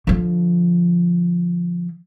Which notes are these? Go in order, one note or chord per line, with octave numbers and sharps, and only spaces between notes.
D3 F3